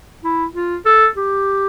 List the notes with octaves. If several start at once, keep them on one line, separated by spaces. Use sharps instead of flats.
E4
F4
A4
G4